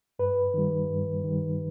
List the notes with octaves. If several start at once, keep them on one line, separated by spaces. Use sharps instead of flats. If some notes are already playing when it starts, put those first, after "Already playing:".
G2 B4
D#3 G3
G2
D#3 G3